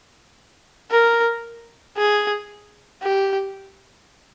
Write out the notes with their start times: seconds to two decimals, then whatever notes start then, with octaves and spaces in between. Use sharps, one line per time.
0.91 A#4
1.97 G#4
3.03 G4